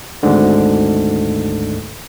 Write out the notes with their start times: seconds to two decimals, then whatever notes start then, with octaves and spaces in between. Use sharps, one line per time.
0.23 G#1 D2 G#2 D3